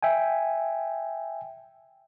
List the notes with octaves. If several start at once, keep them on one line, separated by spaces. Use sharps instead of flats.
E5 G5 G#5